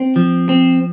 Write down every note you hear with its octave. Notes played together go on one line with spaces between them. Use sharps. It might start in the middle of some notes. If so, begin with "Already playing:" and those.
Already playing: C4
F3
C4